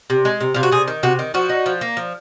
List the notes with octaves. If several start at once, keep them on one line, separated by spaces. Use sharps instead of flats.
C3
G#3
C3
C3 F4
F#4
C3 G#4
D#3
C3 F#4
D#3
F3 F#4
D#4
F3
A#3
F3